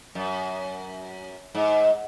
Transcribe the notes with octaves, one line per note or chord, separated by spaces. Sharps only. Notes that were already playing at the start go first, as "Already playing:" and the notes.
F#2
G#2